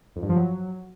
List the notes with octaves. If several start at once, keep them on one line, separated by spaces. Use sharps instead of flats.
F2
G2
F3
F#3